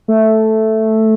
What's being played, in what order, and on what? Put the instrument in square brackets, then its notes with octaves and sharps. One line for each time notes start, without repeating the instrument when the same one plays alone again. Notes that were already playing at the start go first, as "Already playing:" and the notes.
[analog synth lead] A3